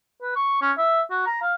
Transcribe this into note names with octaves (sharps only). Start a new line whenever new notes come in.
B4
C#6
C#4
E5
F#4
A#5
F5